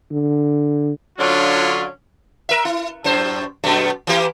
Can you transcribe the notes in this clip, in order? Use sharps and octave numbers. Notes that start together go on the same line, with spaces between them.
D3
D3 F#3 C#4 D4 F4
A#4 E5
E4
F#2 A2 C5
F#2 B2 A3
E3 A#3 G4